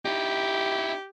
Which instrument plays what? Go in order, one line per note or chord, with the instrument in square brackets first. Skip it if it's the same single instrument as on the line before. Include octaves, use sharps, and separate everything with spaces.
[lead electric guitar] D#4 E4 [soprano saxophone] G4